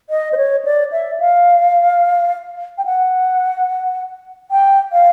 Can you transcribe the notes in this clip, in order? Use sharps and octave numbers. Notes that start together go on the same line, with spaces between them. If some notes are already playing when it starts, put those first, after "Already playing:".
D#5
C5
C#5
D5
E5
F5
G5
F#5
G5
F5